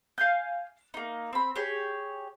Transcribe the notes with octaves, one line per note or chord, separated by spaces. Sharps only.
F5 G#5 G6
A#3 D#4
C4 B5
G4 G#4 C#5